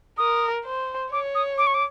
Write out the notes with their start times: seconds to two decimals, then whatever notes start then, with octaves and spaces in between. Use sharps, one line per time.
0.18 A#4 D#6
0.65 C5
1.12 C#5 D6
1.35 D#6
1.58 D6
1.67 C#6
1.74 D6